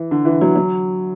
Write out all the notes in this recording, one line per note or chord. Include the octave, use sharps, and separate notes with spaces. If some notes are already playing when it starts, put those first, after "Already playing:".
Already playing: E3
D3
E3
F#3
F#3